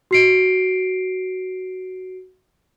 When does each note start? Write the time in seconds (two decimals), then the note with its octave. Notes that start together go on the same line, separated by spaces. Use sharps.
0.11 F#4 C7 D7